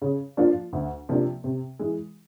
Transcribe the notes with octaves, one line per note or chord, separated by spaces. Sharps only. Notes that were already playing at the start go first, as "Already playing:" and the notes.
C#3
F3 A#3 D4 F4
D2
C3 F3 A#3 D4
C3
E3 G#3